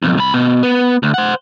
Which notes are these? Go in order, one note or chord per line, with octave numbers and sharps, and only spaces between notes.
B1 F2
C2 B5
B2
B3
D2
C5 F#5